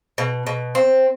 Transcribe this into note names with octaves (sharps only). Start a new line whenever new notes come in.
B2
B2
C4